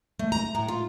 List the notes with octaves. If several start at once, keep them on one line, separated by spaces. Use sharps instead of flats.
A3
A#5
A2
F4